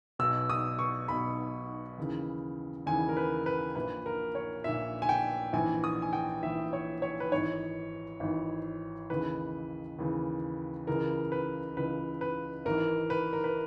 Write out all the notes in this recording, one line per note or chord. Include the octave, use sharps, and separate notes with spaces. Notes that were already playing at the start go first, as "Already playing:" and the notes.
B1 B2 E6
D#6
C#6
B1 B2 B5
D#2 C#3 E3
D#2 C#3 E3 G#5
A#4
B4
B4
A#1 A#2 B4
A#4
C#5
A#1 A#2 E5
G#5
G5
A#1 G#2 E3 G#5
D#6
G#5
G5
A#1 G#2 E3 E5
C#5
C#5
B4
G#1 G#2 E3 C#5
G#1 G#2 E3
D#2 C#3 E3 B4
D#2 C#3 E3
C#2 C#3 E3 A#4
B4
C#2 C#3 E3 B4
B4
G#1 G#2 E3 A#4
B4
A#4
B4